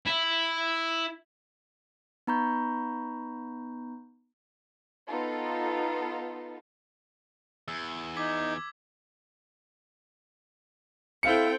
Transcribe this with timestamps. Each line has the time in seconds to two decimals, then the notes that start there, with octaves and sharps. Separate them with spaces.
0.07 E4
2.27 B3 D#4 A#5 B5 C#6 G6
5.08 B3 D#4 F4 A4
7.68 E2 E6
8.17 D#4 D6 G#6 B6
11.23 C4 E4 A4 F5 G5 C#7